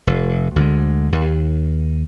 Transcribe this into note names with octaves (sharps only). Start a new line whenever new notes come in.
F1
D2 D3 G#3
D#2